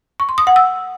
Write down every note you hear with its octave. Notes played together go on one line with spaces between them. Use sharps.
C#6
C6
D#6
F#5
E6